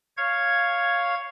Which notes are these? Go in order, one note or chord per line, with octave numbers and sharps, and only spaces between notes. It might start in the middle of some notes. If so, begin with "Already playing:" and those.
C#5 F5 G#6